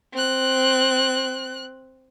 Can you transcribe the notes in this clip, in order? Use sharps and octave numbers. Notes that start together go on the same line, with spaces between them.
C4 F#6